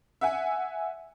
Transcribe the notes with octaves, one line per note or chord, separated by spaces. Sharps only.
E5 F#5 G#5